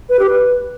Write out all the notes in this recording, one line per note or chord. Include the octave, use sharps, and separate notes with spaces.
B4
G4
B4